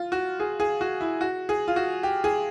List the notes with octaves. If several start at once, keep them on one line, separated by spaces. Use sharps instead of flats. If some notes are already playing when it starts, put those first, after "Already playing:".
Already playing: F4
F#4
G#4
G#4
F#4
E4
F#4
G#4
F4
F#4
G4
G#4